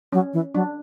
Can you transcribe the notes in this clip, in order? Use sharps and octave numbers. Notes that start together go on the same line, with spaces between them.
F#3 C#4
E3
F#3 D4